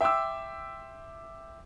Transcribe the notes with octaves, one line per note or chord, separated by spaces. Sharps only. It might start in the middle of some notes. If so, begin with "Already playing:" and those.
E5 G5 C6 D6 E6